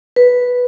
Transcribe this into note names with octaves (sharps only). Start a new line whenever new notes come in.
B4